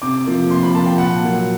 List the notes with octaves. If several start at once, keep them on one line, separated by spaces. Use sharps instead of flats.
C3 D6
F3 A#3
C3 C6
B5
F3 A#3 A5
G5
A#2 F#5
F#3 A#3